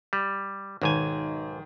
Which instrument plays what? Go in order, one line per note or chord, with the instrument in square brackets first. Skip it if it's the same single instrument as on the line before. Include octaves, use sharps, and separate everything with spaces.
[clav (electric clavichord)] G3
[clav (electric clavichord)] B1 G#2 G#5 [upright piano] D#3